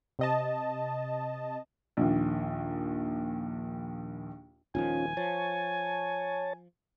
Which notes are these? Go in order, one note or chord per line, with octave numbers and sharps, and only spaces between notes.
C3 D#5 A5
A#1 D#2
D#1 D#3 F3 C#4 F4 G#5
F3 C#5 A5